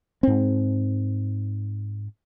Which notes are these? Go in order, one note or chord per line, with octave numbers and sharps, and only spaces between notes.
G#2 C4